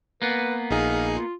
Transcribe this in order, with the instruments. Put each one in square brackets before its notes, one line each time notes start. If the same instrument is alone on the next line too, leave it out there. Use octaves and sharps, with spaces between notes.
[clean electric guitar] A#3 B3 [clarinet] B4
[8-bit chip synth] A#1 D#4 G#4 [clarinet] F5
[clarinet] F4